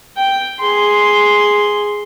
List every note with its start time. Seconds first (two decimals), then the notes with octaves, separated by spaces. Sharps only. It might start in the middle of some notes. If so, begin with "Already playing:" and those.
0.17 G5
0.60 G#4 C6